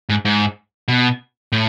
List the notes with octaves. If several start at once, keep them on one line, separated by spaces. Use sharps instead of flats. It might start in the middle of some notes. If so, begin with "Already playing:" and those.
G#2
G#2
B2
A2